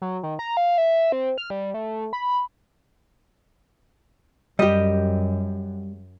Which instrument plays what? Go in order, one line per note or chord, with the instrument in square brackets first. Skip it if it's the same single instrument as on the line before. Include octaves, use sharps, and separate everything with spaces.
[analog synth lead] F#3
D#3
A#5
F5
E5
C4
F6
G3
A3
B5
[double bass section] F#2 [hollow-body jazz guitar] G3 [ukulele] G4 D#5